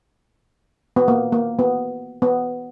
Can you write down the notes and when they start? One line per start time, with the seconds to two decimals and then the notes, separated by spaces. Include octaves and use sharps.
0.96 B3
1.08 A#3
1.32 A#3
1.59 B3
2.22 B3